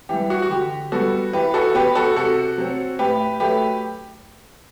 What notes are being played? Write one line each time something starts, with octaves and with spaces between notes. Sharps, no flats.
E3 G3 G4
F#4
F#4
D3 G4
G3 B3 F#4 A4
E3 G4 B4
F#4 A4
B3 G4 B4
F#4 A4
C3 F#4 A4
F#3 C4
A2 G4 B4
F#3 A3 G4 B4